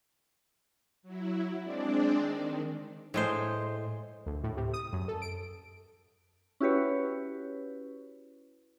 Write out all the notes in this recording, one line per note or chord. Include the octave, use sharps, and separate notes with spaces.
F#3 E4
G#3 C4 D4 D5
D#3
A2 G#3 C5
D2
A2
C3
D#6
F#2
A4
D7
C#4 E4 F#4 G4 B4 C#5